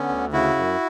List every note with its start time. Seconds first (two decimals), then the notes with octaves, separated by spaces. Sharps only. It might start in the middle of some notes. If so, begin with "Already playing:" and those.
Already playing: D3 B3 C#4
0.09 D2
0.32 C#3 E4 F#4
0.56 F#2